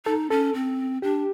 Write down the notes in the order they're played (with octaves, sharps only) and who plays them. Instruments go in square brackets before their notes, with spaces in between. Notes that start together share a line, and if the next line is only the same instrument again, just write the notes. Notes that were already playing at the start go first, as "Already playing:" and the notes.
[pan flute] D#4 [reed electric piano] A4
[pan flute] C#4 [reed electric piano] A4
[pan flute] C4
[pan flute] D4 [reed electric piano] G4